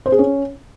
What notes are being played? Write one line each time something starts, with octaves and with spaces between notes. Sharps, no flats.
C5
G#4
C#4